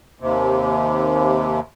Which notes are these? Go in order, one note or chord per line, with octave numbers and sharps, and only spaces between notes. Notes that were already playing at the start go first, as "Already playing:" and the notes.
D#2 C3